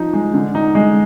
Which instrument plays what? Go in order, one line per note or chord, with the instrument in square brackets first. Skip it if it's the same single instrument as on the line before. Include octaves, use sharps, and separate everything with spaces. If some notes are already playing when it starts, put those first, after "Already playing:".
Already playing: [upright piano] F3 D#4
G#3
D3
D#4
G#3